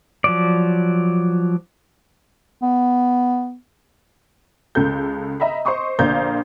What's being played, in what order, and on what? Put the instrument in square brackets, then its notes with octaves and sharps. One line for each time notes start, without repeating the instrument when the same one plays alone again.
[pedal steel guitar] F3 F#3 D5
[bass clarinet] B3
[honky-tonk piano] C#2 C#3 A4 G6
D#5 E5 A#5 B5
C5 D#5 C6 C#6 D#6
A#1 D3 A#3 C5 F5 G6